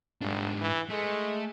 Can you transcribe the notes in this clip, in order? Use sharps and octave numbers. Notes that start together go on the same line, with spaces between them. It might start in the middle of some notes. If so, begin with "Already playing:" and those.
G1 G#2 D4
E3
G#3 A3